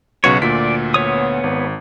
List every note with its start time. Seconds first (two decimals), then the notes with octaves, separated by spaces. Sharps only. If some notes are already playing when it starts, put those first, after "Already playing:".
0.24 B1 C#3 F#4 B4 C#5
0.42 D2 A#2 D5 B6
0.94 B3 C#5 D#6
1.44 G#1